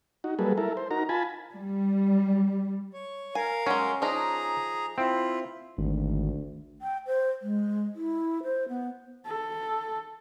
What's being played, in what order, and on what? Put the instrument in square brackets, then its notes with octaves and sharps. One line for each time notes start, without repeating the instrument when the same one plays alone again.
[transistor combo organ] D#4 F#4
F#3 G3 A#3 G#4 A4 B4
E4 A4 A#4
C5
D#4 F#4 A#4 A#5
F4 G#5 A5 B5
[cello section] G3
[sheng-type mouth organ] C#5
[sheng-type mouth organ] A#4 F5 [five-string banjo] G#5
[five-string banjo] F#3 G#3 [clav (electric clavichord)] C#4
[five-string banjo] F3 D4 D#4 [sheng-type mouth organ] G#4 A#5
[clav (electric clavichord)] C4 [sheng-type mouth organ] E4 F4
[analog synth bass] G#1 [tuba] D2
[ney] G5
C5
G#3
E4
C5
B3
[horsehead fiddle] A4